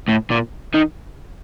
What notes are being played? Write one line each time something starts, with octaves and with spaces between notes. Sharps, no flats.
A2
A#2
D#3